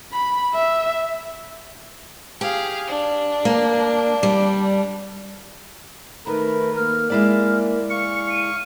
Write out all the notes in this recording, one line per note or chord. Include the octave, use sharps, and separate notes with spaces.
B5
E5
G4 G#4 F5
D4
A#3
G3
D#3 A3 A#4 B4
A#3 F6
G#3 E4 D5
F5 C#6 C#7
D#7